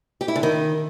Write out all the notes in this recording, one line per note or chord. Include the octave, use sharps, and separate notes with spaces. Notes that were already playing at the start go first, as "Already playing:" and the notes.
G4
E4
D3
D#3